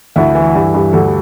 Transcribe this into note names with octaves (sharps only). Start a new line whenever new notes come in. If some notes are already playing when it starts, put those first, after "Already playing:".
D2 E4
E3
G2
G2
D2 A4